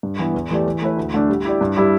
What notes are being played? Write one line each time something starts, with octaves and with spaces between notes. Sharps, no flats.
G2
E3 B3 E4
E2
E3 A3 G4 D5
E3
A3 E4 B4
D2
D3 A3 D4
G3
E4 G4 D5
G2
G3 E4 G4 D5